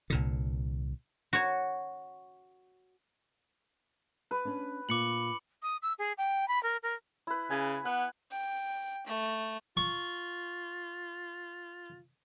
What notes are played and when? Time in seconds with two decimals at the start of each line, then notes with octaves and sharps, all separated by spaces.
0.10 C2 A#2 D3
1.33 F#4 C#5
4.31 B4
4.45 C#4 D4
4.89 A#2 D6 C#7 F#7
5.63 D#6
5.82 E6
5.99 G#4
6.18 G5
6.48 B5
6.63 A#4
6.83 A#4
7.27 E4 B4
7.50 C#3 G#5
7.85 B3 F#5
8.31 G5
9.07 A3
9.77 F4 C#6